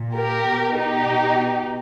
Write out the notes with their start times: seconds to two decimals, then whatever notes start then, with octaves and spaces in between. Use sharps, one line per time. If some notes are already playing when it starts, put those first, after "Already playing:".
Already playing: A#2
0.15 G4 A#4
0.46 B2
0.77 D#4 G4
1.07 B2